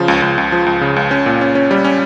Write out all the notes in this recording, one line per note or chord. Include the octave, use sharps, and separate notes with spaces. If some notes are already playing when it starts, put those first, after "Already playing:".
Already playing: C#3 F3
C#2
C#2
C#2
F3
C#2
C#3
C#2
C#4
A#2
C#4
C#4
G3
C#4